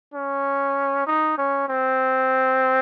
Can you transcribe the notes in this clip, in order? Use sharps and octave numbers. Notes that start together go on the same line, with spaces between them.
C#4
D#4
C#4
C4